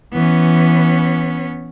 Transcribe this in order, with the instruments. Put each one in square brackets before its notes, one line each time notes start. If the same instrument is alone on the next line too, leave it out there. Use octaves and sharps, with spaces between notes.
[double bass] E3 [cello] B3 C#4